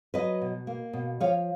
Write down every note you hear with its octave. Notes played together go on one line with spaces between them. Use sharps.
F#3 B4 D#5
B2
A#3
B2
F3 C#5 F5